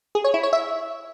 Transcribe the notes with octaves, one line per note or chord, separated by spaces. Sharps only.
G#4
C#5
E4
C#5
E5